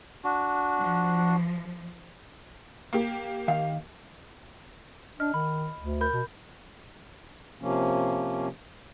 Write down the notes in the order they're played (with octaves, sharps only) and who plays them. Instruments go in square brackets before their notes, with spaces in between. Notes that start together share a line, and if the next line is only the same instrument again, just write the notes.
[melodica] D4 F#4
[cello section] F3
[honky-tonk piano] A#3 G4
[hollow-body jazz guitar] D#3 F5
[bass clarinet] D4 [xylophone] D#5 F6
[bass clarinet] D#3 [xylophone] B5
[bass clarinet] D2
[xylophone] A#4 B5 G6
[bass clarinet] B2
[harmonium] C3 F3 A#3 C#4